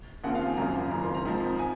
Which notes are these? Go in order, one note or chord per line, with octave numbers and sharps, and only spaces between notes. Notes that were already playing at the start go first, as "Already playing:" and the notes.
D#2 C#3 F3 C4 F#5
F5
G#5
G#1 F#2 C#3 F3 A#5
F#1 F2 D#3 A#5
C6
A#5
G#2 F3 C4
G#5